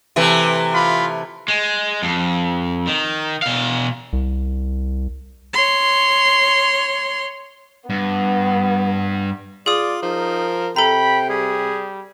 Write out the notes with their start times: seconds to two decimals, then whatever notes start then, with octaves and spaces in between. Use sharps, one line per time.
0.16 C3 E3 A3
0.73 F4 B5
1.48 G#3
2.03 F2
2.87 D#3
3.42 B2 F5
4.13 C2
5.53 C#5 C6
7.90 G2 B3
9.66 F4 G#4 D5 D#6
10.02 F3 D#4 A#4
10.76 C3 A4 G5 A#5 B5
11.29 G3 G#4